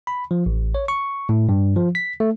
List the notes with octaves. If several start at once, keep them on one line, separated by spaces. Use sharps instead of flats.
B5
F3
A1
C#5
C#6
A2
G2
F3
B6
A3